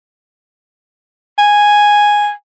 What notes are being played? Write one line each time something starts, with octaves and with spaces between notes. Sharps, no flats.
G#5